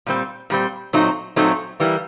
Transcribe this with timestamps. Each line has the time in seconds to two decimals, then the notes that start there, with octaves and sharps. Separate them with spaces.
0.06 A#2 G3 C4
0.50 A#2 G3 C4
0.93 A#2 F#3 A3 C4 D#4
1.36 A#2 F#3 A3 C4 D#4
1.80 E3 G3 A#3